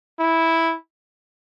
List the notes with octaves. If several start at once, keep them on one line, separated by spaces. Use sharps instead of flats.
E4